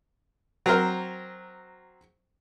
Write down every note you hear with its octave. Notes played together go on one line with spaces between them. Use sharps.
F#3 C4 A#4 C5